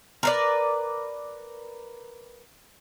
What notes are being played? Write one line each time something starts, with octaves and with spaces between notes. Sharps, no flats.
A#4 B4 D5